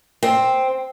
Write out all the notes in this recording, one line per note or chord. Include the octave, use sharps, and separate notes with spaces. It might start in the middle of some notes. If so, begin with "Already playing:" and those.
C4